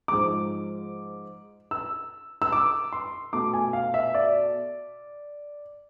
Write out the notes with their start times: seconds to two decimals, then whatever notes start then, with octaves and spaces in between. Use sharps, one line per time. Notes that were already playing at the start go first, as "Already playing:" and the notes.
0.08 G#2 F3 G#3 D6
1.71 E6
2.42 E6
2.52 D6
2.93 C6
3.33 B2 A3 D6
3.53 G#5
3.73 F5
3.94 E5
4.14 D5